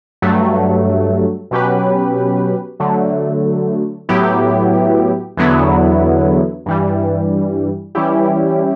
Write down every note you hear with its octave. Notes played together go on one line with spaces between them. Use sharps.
G2 F#3 A3
B2 F#3 C#4 G4 B4
D3 F#3 A3
A2 F#3 B3 E4 G4
E2 D3 F#3 B3 E4
G2 E3 G3
E3 G3 C#4 E4 G4